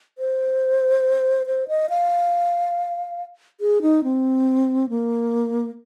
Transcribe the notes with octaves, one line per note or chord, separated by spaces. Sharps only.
C5
C5
D#5
F5
G#4
D#4
C4
A#3